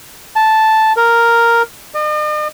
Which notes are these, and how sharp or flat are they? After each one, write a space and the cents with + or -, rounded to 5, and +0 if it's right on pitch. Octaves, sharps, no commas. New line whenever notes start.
A5 -5
A#4 +0
D#5 -45